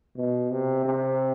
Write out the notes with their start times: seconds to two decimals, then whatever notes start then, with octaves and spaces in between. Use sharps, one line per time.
0.16 B2
0.51 C3
0.85 C3